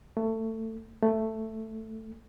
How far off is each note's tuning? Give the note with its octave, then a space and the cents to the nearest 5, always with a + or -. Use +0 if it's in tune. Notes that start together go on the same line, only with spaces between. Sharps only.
A3 +20
A3 +5